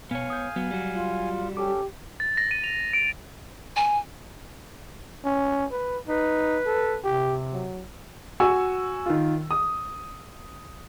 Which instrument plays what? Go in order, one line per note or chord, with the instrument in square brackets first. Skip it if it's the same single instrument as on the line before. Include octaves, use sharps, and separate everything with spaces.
[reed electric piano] B2 [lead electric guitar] B3 C#5 [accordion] F5 G#5
[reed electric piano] D#6 G6
[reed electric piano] F#3 [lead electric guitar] B3
[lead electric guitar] G3 F#4
[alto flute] F4
[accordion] C#4 A4 [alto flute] G4 [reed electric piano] D6
[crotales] A6
A#6
D#7
F7
D7
[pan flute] G#5
[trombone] C#4
B4
[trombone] D#4 [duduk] B4
[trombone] A4
[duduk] C3 [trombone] G4
[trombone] F#3
[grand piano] F#4 G#5 C#6 E6
D#3 F4
D#6